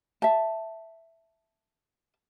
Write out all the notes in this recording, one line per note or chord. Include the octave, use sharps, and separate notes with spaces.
E5 A5